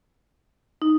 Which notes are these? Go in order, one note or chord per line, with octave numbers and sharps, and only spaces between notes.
D#4